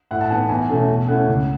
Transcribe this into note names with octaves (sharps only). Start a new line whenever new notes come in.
A2 F#5
A5
E3 B3 D#4 G#5
E2 G#5
B2 A3 C#4 E4 A5
B2 G#5
A3 C#4 E4 F#5
C#2